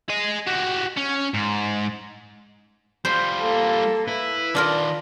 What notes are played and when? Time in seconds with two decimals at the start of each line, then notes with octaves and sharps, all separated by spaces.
0.10 G#4 D#5
0.47 F#4 G4
0.97 C#4
1.34 G#2
3.05 G3 F4 C5
3.41 A#3 A4
4.08 E4 B4
4.55 D#3 D4 F4 A#4 D5